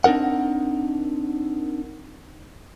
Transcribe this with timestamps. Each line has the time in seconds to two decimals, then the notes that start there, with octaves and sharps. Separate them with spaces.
0.04 C4 D4 D#4 A#4 F#5